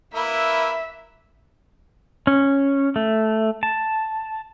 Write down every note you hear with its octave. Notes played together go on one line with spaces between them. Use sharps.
A#3 E4 B4 E5
C#4
A3
A5